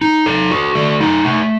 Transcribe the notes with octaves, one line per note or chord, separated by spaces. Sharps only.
D#4
A4
F#4
A3
D#4
A3